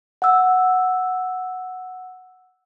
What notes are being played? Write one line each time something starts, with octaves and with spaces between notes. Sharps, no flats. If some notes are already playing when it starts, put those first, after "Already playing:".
F#5 E6